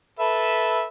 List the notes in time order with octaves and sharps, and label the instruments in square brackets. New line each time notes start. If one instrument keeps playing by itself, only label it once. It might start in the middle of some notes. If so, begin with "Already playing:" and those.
[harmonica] A4 B4 E5